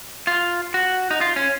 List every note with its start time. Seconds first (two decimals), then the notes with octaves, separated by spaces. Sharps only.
0.27 F4
0.74 F#4
1.11 D#4
1.21 F4
1.36 C#4